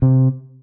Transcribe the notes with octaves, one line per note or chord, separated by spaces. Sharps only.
C3